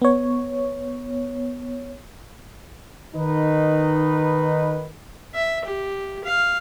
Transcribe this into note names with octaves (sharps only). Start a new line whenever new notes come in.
B3 C#5
D#3 D#4 B4
E5
G4
F5